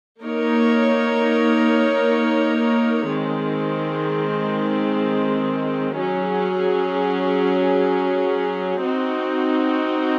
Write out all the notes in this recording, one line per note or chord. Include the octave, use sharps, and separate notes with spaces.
A#3 D#4 A#4 C#5
D#3 G#3 C4
F#3 C#4 G#4
C4 D#4 F#4